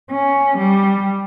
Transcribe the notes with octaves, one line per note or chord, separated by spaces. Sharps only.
C#4
G3